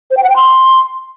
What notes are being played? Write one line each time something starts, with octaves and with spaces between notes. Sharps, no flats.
C5
G5
F#5
G5
C6